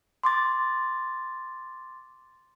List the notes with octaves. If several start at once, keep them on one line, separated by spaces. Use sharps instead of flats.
C6 D6 A6